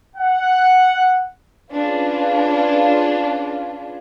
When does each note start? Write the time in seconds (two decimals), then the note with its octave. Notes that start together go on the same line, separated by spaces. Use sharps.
0.16 F#5
1.72 C#4 D4 F4 G#4 B4